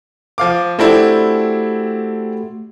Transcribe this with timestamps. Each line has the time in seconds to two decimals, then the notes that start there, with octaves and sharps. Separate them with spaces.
0.38 F3 F5 D6
0.79 A3 C4 D4 E4 F#4 G4